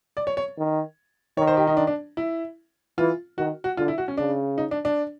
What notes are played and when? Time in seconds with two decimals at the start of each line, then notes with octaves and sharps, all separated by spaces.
0.17 D5
0.27 C#5
0.37 C#5
0.58 D#3
1.37 D#3 C#5
1.47 C5
1.57 G4
1.67 D#4
1.77 D4
1.87 D4
2.17 E4
2.98 E3 F4
3.38 D#3 F#4
3.64 F#4
3.77 D3 F4
3.88 E4
3.98 F#4
4.08 C#4
4.17 C#3 D4
4.58 D#4
4.71 D4
4.85 D4